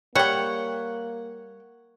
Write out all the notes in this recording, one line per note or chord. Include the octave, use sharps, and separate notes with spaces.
G3 A#3 C#5 F#5 G5